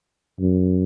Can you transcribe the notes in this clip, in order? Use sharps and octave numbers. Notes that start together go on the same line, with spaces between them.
F#2